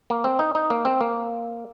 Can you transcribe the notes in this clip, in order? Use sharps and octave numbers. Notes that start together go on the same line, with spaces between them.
A#3
C4
D#4
D#4
A#3
C4
A#3